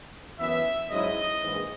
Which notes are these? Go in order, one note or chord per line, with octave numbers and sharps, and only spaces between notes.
F#2 E3 B3 E5
G#2 F#3 C#4 E4 D#5
A#1 G#2 E3